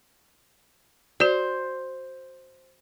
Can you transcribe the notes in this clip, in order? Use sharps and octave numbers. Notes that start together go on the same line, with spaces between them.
F#4 C5 D5